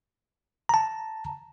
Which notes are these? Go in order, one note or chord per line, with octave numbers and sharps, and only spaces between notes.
A5 A#5